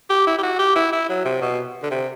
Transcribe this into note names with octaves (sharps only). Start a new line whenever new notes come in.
G4
E4
G4
F#4
G4
E4
E4
F#3
C3
B2
D3
C3